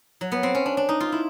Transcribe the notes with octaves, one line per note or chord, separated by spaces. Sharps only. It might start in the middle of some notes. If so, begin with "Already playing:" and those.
F#3
B3
C4
C#4
D4
D4
D#4
F4
E4